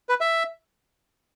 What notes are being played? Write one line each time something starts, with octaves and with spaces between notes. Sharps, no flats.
B4
E5